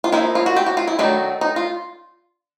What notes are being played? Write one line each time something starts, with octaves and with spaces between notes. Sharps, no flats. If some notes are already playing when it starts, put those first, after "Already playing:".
F4
F3 A#3 D#4 E4
F4
F#4
G4
F#4
F4
E4
D#3 F#3 A3 D4 D#4
D#4
F4